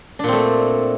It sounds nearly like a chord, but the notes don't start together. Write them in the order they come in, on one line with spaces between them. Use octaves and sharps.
D4 A#2 C4 A3